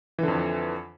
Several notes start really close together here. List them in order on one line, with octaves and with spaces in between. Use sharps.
E3 D3 F2